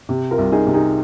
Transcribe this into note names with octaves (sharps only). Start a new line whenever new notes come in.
C3
F4 A#4
C2
D#4 G#4
C3
D#4 G#4